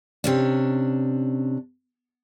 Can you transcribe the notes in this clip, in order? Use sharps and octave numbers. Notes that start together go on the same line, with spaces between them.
C3 C#4 D4